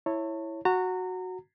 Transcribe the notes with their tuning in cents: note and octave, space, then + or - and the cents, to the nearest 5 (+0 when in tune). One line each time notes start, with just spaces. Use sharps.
E4 +0 C#5 -10 A5 +35
F#4 -5 A#5 -30